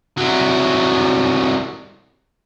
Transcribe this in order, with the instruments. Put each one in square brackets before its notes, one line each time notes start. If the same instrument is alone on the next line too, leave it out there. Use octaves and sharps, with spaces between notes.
[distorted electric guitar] C2 F#3